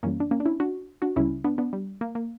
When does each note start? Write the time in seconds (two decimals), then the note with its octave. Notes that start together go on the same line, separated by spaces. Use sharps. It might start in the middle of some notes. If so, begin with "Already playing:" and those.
0.03 F#2 E3 G3 A#3 C#4
0.20 D4
0.31 A#3 C#4
0.40 D4
0.46 C#4 E4
0.60 D4 F#4
1.02 D4 F#4
1.16 C#2 C#3 G3 C#4 E4
1.44 B3 D4
1.58 B3 D4
1.73 G3
2.01 A#3
2.15 A#3